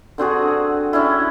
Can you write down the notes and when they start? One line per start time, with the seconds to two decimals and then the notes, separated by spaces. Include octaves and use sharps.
0.18 D3 C4 F#4 G#4
0.93 C#4 D4 E4